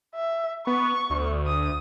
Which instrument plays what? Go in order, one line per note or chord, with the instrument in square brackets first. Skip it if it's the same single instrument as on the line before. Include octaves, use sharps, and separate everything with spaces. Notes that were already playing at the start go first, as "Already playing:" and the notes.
[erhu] E5
[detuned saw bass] B3 [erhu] C#6
[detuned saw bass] D2
[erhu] D#6